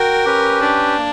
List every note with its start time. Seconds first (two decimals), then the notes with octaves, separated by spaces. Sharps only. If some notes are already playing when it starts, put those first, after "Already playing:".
Already playing: F#4 A#4 G5
0.25 C#4 G4 B4
0.61 D4
0.97 A#3